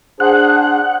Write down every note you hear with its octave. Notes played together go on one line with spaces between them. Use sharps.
D4 G#4 C5 F#5